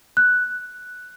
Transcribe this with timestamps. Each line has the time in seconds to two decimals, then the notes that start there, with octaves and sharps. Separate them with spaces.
0.17 F#6